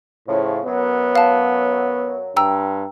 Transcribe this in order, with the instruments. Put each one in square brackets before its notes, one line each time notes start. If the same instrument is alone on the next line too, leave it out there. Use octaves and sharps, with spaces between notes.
[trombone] A2 [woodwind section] C#3 F3
[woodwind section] F#2 F#3 [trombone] B3
[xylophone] F5 A5
[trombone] G2 [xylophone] G5 A#5 E6